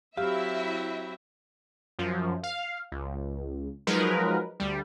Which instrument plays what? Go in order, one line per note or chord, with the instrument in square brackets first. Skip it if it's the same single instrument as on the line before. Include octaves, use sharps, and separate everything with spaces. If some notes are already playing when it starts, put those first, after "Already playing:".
[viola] F#3 C4 [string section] E4 E5 [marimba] G4 [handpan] F5
[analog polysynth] F#2 F3
F5
C#2
F3 F#3 G#3 D#4 A#4 B4
D2 G3